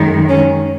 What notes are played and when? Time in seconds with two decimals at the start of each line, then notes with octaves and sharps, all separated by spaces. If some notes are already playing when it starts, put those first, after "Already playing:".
Already playing: F#2 D#3 G#3
0.28 C#4